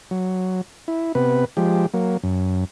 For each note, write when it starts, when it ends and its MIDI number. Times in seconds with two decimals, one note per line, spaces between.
0.11 0.61 54
0.88 1.12 64
1.15 1.45 48
1.15 1.45 59
1.15 1.45 71
1.57 1.86 53
1.57 1.86 56
1.57 1.86 67
1.94 2.17 54
1.94 2.17 58
2.23 2.64 42